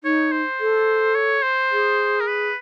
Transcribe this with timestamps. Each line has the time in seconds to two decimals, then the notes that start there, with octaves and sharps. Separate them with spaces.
0.04 D#4 C#5
0.32 C5
0.60 A4
1.15 C#5
1.43 C5
1.71 G#4
2.20 A#4
2.27 B4